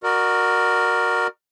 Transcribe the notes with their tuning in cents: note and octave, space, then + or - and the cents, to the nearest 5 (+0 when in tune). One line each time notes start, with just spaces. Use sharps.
F#4 -5 A#4 +0 D5 +30